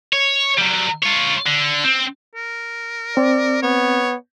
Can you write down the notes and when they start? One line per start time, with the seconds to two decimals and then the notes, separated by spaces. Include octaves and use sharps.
0.13 C#5
0.58 F#3 G3
1.03 F4 C#5
1.46 D3
1.84 C4
2.36 A#4
3.17 C4 D5
3.63 B3 C#5